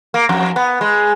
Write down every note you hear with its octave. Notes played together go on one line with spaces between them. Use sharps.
A#3
F2
B3
G#3